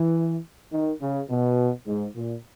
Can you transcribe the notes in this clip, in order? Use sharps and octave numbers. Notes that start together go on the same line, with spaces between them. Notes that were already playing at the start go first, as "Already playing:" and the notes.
Already playing: E3
D#3
C#3
B2
G#2
A#2